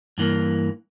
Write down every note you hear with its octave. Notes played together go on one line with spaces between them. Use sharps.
G2 E3 A#3